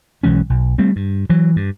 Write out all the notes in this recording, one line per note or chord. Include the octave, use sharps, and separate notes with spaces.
B1 E3 G#3 C#4
B1
G3 A3 C4
G2
E3 F#3
G2